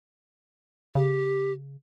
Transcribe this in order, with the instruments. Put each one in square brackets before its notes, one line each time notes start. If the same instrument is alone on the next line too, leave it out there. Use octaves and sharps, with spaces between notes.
[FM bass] C#3 [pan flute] G4